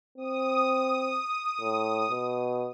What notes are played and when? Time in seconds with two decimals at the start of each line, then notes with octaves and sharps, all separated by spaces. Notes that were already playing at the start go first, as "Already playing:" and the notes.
0.18 C4 D#6
1.61 A2
2.10 B2